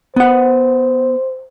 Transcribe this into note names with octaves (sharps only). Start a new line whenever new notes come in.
B3 C5 F#5